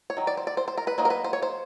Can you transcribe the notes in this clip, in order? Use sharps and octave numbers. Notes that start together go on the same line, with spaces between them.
C#5
D#3 F#3
D5
C5
D5
C5
C5
A#4
B4
F#3 A#3 D#4 C5
A#4
B4
C5
C#5
C5